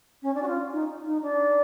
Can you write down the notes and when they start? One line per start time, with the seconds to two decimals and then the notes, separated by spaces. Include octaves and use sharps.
0.23 C#4
0.35 D4
0.42 F#4
0.48 F4
0.72 D#4
1.06 D#4
1.22 D4